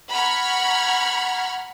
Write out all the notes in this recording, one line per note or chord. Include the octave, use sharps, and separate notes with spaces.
F#5 A#5 B5 C#6 F6 G#6